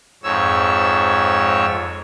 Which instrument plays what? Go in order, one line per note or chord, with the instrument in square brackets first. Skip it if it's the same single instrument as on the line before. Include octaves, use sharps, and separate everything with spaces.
[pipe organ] F2 G#2 C#5 E6